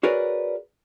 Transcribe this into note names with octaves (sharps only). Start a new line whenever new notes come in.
F#4 G#4 A#4 B4 C#5 D5